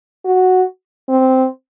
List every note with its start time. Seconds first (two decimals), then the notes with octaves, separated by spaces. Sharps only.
0.25 F#4
1.09 C4